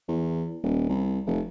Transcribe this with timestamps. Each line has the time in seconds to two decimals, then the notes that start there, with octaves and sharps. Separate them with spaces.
0.08 E2
0.63 D#1
0.89 C2
1.27 F1